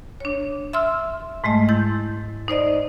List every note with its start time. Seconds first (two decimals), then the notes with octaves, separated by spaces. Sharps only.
0.20 D4 C#5
0.73 E5 C6 E6 F6
1.44 G#2 G#3 A3 D#5
1.69 E4 G6 A6
2.48 D#4 C5 D5 D#5